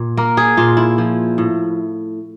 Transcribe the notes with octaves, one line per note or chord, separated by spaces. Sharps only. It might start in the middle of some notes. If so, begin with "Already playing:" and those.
Already playing: A#2
A#3 A#4
G#4
A#2 F4
E4
F3
A2